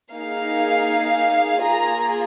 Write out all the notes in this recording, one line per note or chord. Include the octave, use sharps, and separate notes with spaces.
A#3 D#4 G#4 F5
A#3 F4 G#4 A#5